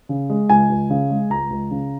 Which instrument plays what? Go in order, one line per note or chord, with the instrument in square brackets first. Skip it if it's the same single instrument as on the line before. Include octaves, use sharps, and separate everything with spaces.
[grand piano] C#3
G#3
C#2 G#5
C#2
C#3
G#3
C#2 A#5
C#2
C#3